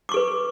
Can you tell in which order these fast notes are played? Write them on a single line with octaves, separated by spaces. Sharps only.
D6 C#6 A4 B4